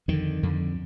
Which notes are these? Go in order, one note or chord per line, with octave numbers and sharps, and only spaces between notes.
F2 D3 D#3
F2 D3